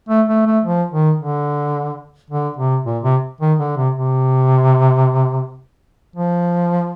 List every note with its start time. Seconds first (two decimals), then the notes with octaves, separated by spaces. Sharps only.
0.09 A3
0.28 A3
0.46 A3
0.64 F3
0.91 D#3
1.20 D3
2.30 D3
2.57 C3
2.85 A#2
3.03 C3
3.41 D#3
3.59 D3
3.77 C3
3.96 C3
6.16 F3